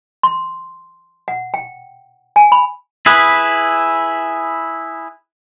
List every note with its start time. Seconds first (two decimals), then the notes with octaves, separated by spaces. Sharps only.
0.23 C6
1.28 F#5
1.54 G5
2.36 G#5
2.52 B5
3.06 E4 G#4 B4